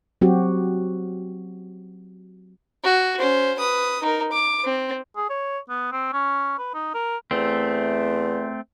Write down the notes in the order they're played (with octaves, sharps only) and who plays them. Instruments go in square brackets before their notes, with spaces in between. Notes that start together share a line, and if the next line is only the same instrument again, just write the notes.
[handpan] F#3 C4 F#4 G4
[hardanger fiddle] F#4
C#4 C5
B4 D#6
D#4 A#4
D6
C4
[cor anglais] G#4
C#5
B3
C4
C#4
B4
D#4
A#4
[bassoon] E2 [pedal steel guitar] A3 C4